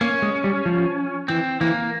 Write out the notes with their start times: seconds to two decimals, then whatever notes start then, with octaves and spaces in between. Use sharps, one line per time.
0.01 A#3 C#4
0.22 G#3
0.44 G3
0.66 F3
1.28 E3 C4
1.61 E3 A#3